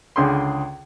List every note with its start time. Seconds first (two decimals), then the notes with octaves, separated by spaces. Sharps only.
0.16 C#2 D3 G#4 G5 C6